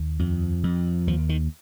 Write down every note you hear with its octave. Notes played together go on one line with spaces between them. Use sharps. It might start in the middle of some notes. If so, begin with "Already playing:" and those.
Already playing: D#2
F2
F2
D#2 F3
D#3